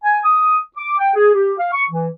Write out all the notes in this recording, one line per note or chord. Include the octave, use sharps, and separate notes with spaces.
G#5
D#6
D6
G5
G#4
G4
F5
C#6
E3